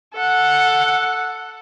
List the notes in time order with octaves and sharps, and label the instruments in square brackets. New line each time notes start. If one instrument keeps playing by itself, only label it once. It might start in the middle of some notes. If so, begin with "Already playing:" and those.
[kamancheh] A4 F#5